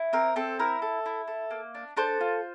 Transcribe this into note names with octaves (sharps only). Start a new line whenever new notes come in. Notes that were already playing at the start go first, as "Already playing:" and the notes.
Already playing: E4
C4 A#4
C4 A4
E4 A#4
A4
E4
A4
A#3
D4
D4 A4 C5
F4